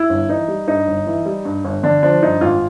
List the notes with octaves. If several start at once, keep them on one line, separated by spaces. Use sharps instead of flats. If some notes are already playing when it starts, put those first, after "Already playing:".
Already playing: E4
G1
E3 D#4
G3
G2 D#4
G1
E3
G3
G2
G1
D3 D4
F3 D4
G2 D#4
G#1 F4